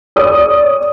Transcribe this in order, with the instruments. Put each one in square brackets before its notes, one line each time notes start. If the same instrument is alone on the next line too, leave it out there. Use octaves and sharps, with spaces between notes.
[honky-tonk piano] C#5 D5 D#6